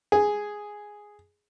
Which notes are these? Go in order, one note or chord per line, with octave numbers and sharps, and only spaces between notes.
G#4